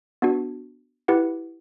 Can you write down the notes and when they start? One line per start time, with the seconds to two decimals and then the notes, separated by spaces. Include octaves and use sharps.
0.22 B3 D4 F#4
1.08 E4 G4 B4 F#5